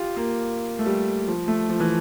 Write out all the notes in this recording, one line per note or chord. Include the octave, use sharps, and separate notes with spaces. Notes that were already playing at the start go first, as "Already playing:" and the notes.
Already playing: F4 G4
A#3
A3
G3
F3
A3
F3
E3